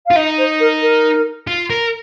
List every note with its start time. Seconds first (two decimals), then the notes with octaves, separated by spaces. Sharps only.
0.06 F4 F5
0.16 D#4 D#5
0.38 C5
0.60 A#4
0.82 A#4
1.47 F4
1.70 A#4